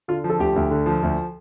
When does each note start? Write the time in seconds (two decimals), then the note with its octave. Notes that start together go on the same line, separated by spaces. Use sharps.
0.08 D3 F4
0.24 F3
0.30 A4
0.39 D2 G4
0.56 D2
0.71 D3
0.86 F3
1.03 D2